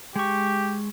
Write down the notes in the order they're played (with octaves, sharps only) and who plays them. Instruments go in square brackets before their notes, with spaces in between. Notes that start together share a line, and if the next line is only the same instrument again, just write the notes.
[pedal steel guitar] G#3 C#6 [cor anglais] G4